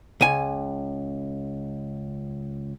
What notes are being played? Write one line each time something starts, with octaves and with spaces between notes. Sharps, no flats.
C#2 G#5